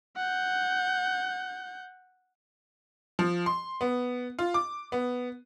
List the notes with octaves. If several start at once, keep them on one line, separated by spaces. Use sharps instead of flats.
F#5 G6
F3
C6
B3
F4
D6
B3